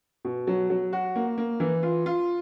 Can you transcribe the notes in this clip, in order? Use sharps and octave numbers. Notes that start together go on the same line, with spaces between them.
B2
F#3
F#3
F#4
A#3
A#3
E3
F4
F4